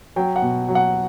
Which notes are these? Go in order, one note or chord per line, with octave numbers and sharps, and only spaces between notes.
F#3 G5
F#5
B2
F#3
F#5